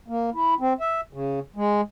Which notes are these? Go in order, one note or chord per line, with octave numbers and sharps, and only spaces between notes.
A#3
E4
C4
E5
C#3
G#3